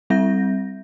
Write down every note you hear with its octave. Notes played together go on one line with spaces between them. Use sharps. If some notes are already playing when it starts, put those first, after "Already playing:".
G3 C4 E5 G6 A#6